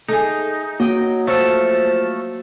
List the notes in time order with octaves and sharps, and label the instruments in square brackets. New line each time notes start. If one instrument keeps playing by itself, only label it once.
[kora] A3 G#4 [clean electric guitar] D#4
[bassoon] F#3 [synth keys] A#3 F#4 [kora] D#5 G5
[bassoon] F3 [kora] F#3 [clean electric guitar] A3 A4